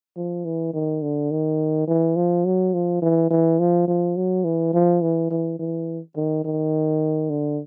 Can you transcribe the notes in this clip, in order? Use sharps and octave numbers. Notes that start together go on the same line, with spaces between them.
F3
E3
D#3
D3
D#3
E3
F3
F#3
F3
E3
E3
F3
F3
F#3
E3
F3
E3
E3
E3
D#3
D#3
D3